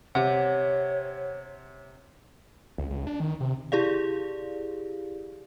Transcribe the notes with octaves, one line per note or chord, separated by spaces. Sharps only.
C3 G4 C#5 F#5
C#2
C#2
D4
D#3
C3
E4 G4 G#4 D5 F5